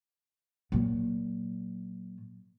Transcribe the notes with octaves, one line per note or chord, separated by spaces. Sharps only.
A#2 F#3